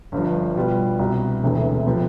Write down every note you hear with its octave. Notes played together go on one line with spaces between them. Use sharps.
G1 G2 F3
B2 G3 B3 F4
C2 B2 B3
E1 D2 C3 E3 A3
C3 F3 B3